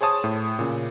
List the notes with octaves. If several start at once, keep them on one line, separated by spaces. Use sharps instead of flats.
G#4 C5 C#5 A5 D#6
A2
A#2 C#3